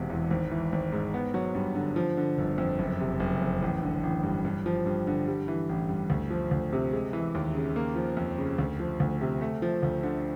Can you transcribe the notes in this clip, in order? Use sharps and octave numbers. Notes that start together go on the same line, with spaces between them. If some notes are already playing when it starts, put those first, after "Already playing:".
Already playing: E1 C3 E3
E2
G#1
E3
G#1
G#2
B3
F#3
G2
D3
F3
D3
G1
F2
F#1
C3
F#1
F2
A1
D3
A1
G2
G2
F3
G2
D3
G3
E3
A1
G2
D2
F3
D2
C3
G#3
E3
D#2
C#3
A#3
F3
F2
C#3
D2
F3
D2
C3
A3
F3
D2
D3